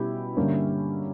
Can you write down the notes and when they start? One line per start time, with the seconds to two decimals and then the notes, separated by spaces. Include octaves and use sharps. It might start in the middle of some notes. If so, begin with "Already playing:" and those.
Already playing: B2 G3 C#4 E4 G4
0.36 G2 D3 A#3 C#4